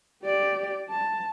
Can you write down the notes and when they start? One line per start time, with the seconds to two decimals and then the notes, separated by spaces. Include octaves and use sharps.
0.22 G4 D5
0.90 A5